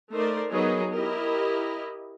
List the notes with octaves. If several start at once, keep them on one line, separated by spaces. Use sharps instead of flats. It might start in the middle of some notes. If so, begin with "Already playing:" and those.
A3 D#4 A#4 C5 D5
F#3 B3 D#4 G#4 A#4 B4
E4 G4 A#4 D#5